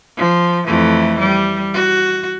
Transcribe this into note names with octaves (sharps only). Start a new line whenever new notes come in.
F3
F2 E3 A3
G3
F#4